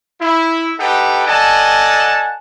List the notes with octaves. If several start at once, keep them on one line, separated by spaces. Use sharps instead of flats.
E4
D#4 G4 A4 B4 F#5 G5
A4 D5 D#5 F#5 G#5 A5